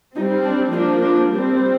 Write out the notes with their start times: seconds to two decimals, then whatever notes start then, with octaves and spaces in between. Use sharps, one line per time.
0.15 C4 D#4
0.19 G3
0.44 D4
0.72 F3 A#3 D4 D#4
1.01 D4
1.30 G3 C4